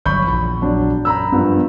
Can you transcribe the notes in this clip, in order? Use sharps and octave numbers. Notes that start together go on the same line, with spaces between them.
G1 F#3 B5 C#6 G6
A#1 E2 A#2
F#3 D4
F#2 A#5 B5 E6
G2 F3 B3